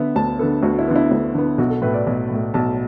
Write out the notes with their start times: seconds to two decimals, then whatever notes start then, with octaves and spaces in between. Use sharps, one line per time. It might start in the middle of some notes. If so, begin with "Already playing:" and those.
Already playing: D3 B3 E5
0.16 D2 A5
0.39 D3 B3 A4
0.63 D2 F#4
0.79 E4
0.88 D3 B3
0.96 E4
1.11 D2
1.34 D3 B3
1.58 B1 F#4
1.70 A4
1.82 A2 A3 B4
1.94 D5
2.07 B1
2.30 A2 A3
2.54 B1 A5